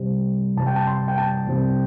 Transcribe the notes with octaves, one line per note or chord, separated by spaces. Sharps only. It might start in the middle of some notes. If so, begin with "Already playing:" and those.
Already playing: C3 G3 C4
C3 G3 C4 A5
G5
A5
C6
G5
A5
C3 G3 C4